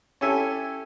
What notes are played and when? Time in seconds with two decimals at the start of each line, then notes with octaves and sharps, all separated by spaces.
0.21 C#4 E4 G4 A4 E5 G#5